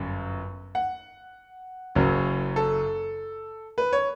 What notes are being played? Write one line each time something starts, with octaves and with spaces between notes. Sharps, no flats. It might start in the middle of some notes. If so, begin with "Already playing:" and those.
Already playing: G1 F#2
F#5
F#1 F#2 C#3 F#3
A4
B4
C#5